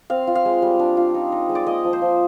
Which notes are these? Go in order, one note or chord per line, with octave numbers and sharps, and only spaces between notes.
C4 F5
F4
F5
G#3
G3
D4
F4
D#4
D#4
G#3
D5
A#3 D#5
F3
C5
F3